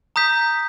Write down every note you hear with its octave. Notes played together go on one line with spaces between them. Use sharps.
A#5 D#6 G6 B6